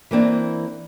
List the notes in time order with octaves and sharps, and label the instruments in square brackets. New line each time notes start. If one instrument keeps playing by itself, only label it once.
[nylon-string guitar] E3 A#3 C4 D4